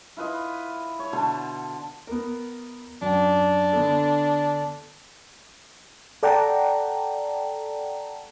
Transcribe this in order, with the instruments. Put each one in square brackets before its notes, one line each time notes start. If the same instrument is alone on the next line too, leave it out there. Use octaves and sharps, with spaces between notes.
[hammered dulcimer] E4 F4 B4 D#5
C#5
B2 D3 A4 C6
[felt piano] B3 A#4
[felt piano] F#2 G5 [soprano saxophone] D4
[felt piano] D3 B3 A4
[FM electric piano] A4 D5 F#5 G5 A5 A#5